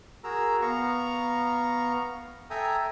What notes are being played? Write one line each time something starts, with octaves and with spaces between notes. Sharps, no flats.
F#4 G#4 A#4 A#5 E6
B3 F5 A#5 C#6
A4 E5 G5 G#5 A#5 D#6